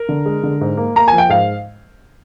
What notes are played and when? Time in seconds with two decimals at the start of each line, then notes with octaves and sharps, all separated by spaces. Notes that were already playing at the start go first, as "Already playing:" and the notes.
Already playing: A#4
0.09 D3
0.26 G#3
0.43 D3
0.61 G#2
0.77 A#3
0.96 A#3 A#5
1.08 F3 G#5
1.18 G5
1.29 G#2 F5